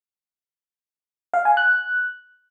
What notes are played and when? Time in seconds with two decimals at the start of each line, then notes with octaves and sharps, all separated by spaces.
1.34 F5
1.45 G#5
1.57 F#6